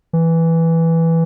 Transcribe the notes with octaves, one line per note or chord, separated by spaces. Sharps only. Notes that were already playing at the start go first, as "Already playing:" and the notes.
E3